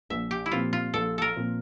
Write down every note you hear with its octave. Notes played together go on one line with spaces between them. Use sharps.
A#1 E5
G4
E4
A#2 F3 C4 F4
F4
A#1 A4
A4 A#4
A#2 F3 C4